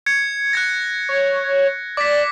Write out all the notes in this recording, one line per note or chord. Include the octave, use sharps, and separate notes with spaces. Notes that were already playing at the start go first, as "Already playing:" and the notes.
G#6 C#7
F#6 G#6 A#6
C#5
D5 D6 B6